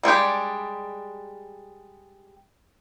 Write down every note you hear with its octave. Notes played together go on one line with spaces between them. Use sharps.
G3 G#3 D4 G4